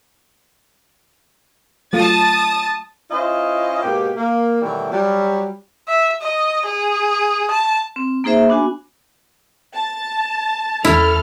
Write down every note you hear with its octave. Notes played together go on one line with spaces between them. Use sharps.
F#3 A3 F4 A5 D#6 A6
C#4 E4 F4 C5 D#5
G#2 B2 A#3 G4
A#3
B2 D#3 E3 F#3 G3 A3
F#3 G3
E5
D#5
G#4
A5
C4
A#3 D#4 G#4 C5 E5
B3 D4 F#4 G#5
A5
E2 E4 A4 F6